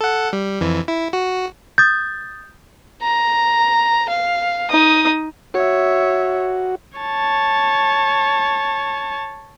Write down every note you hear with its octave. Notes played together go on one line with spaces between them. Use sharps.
A4 F#5
G3
F2 E3
E4
F#4
D#6 G6 A6
A#5
F5
D#4 D#6
F#4 C#5 E5
C#5 A5